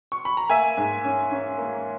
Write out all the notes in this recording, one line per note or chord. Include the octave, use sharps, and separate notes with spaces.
C#6
B5
A#5
A#3 E5 G#5
G#2
C#4
C#4
A#3